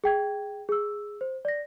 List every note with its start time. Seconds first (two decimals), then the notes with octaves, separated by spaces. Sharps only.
0.04 G#4 G5 G#6
0.69 G#4 E6
1.21 C5
1.45 D5 A#6